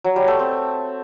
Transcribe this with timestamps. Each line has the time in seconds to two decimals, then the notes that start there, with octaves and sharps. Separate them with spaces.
0.04 F#3
0.16 G3
0.28 A3
0.39 C4